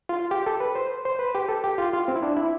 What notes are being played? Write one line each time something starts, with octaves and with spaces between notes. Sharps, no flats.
F4
G4
A4
B4
C5
C5
B4
G4
A4
G4
F4
F4
C4
E4
D4
E4